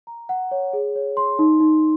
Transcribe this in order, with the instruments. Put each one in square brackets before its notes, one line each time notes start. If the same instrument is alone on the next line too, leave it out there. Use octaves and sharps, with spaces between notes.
[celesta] A#5
F#5
C#5
G#4
C#5
C6
D#4
D#4